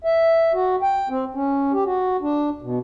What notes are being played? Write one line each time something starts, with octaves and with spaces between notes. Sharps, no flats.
E5
F#4
G5
C4
C#4
G4
F#4
D4
B2